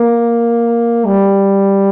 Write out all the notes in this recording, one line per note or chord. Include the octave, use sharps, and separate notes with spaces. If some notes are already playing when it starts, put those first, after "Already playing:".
Already playing: A#3
G3